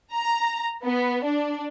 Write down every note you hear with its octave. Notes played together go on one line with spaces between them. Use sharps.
A#5
B3
D4